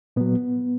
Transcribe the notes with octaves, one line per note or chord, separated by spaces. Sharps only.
A#2 F#3 B3